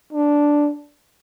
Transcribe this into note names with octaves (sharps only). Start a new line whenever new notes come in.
D4